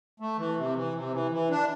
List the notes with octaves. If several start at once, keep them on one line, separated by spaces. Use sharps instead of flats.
A3
E3
C3
E3
C3
E3
E3
D4